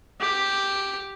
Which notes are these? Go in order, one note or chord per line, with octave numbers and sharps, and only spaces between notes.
G4